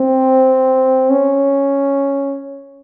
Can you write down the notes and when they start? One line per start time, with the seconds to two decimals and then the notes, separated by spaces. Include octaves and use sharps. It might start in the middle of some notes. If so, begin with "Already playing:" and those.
Already playing: C4
1.10 C#4